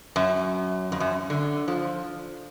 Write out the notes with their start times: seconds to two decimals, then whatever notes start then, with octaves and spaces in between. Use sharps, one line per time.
0.16 F#2
0.92 F2
1.00 F#2
1.30 D3
1.68 F3